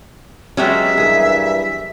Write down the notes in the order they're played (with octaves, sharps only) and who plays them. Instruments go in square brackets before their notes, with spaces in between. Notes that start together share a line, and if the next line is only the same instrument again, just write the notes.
[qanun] F#3 G#3 B3 [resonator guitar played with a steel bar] C#4 G4 [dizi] E5
[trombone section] G2 E3 A#4 [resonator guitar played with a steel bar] G#4